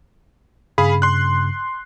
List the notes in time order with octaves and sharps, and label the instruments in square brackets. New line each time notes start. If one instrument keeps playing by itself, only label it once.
[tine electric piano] G2 C#3 [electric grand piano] G#4 F5 B5
[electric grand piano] C6 F#6